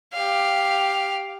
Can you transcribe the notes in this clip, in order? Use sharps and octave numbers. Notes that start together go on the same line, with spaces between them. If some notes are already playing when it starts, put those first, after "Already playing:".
G4 F5